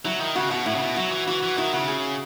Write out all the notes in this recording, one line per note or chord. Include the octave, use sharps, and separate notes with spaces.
F#3 E4
D#3
C#3 F#4
B2 F#4
A2 E4
C#3
B2
F#3 F#4
E3
E3 F#4
E3
D#3 E4
C#3 F#4
G#4